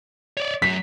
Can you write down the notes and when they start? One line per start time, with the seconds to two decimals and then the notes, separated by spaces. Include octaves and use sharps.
0.37 C#5 D5
0.62 F#2 F#3 B6